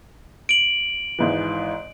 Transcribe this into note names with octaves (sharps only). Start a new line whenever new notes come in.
D7 F#7
G#1 G#2 E3